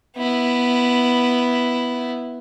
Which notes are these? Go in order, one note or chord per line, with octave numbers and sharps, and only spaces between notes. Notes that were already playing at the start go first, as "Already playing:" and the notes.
B3 E4